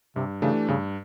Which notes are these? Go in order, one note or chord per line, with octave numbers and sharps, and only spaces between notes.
G2 C3
C#3 E3 A3 D4 G4
G2 C#3